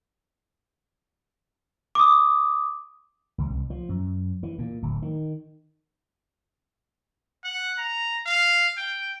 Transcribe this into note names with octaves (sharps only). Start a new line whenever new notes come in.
D6 D#6
C#2
C2
F3
F#2
E3
A#2
D1
D#3
F#5
A#5
F5
G5